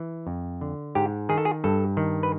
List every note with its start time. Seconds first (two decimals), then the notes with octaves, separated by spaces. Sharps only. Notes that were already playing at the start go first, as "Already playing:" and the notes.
Already playing: E3
0.27 F2
0.61 D3
0.95 G#2 G4
1.29 D#3 G#4
1.38 A4
1.45 G#4
1.64 G2 A4
1.97 D#3
2.23 B4